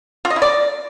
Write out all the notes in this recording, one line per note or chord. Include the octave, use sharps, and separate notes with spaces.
F4
D#5
E4
D5